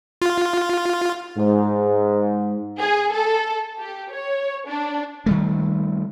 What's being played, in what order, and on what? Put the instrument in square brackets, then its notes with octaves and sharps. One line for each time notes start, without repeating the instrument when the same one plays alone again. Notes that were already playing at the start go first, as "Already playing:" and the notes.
[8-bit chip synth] F4
[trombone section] G#2
[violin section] G#4
A4
G4
C#5
D4
[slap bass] D#3 G3 A3